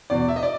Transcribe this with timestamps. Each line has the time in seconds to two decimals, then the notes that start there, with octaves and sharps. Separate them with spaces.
0.10 E2 B2 D5
0.28 E5
0.36 D#5
0.43 D5